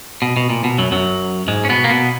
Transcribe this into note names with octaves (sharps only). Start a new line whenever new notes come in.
B2
B2
A#2
B2
F#2 F#3
F#2 F#3
G#2 G#3
C#4
B2 B3
A#3
B2 B3